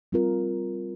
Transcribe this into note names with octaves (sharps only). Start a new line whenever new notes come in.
G3 C4 F4 A#4